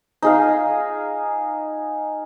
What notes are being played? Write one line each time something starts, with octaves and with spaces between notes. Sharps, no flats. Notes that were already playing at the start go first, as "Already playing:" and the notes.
D#4 G#4 F5